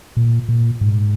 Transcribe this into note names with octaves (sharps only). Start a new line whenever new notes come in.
A#2
A#2
G#2